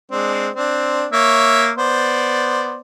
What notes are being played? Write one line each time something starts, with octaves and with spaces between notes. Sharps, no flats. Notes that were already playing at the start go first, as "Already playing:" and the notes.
G#3 C4 D4
C4 D4
A#3 C#5 E5
B3 C5 D5